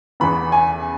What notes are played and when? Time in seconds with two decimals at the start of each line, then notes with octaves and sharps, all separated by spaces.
0.20 E2 E3 B3 B5
0.52 G#5